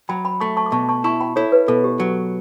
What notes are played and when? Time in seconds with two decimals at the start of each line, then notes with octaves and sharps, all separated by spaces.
0.09 F#3 G5 B5
0.24 G5 B5
0.41 A3 A5 C#6
0.57 A5 C#6
0.66 D6
0.72 B2 A5 C#6
0.89 A5 C#6
1.04 E4 A5 C#6
1.20 G5 B5
1.36 E4 A4 C#5
1.52 B4
1.68 B2 A4
1.84 G4
2.00 F#3